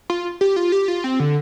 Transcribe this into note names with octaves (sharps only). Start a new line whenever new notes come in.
F4
G4
F4
G4
F4
C4
D3